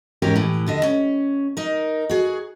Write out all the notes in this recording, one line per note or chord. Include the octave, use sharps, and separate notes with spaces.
E2 G#2 E3 C#4 G4 A#4
A2 E3
D#2 D3 D#5
C#4
D#4 A#4
F#4 G#4